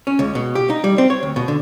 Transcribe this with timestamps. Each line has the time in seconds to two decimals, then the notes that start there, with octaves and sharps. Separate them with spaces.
0.07 C#4
0.19 C#2
0.35 B2
0.55 G4
0.70 D#4
0.84 G3
0.98 C4
1.10 C#5
1.23 D2
1.36 B2
1.48 D3